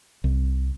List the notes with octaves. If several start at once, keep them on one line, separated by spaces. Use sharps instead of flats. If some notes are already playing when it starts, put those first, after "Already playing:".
C2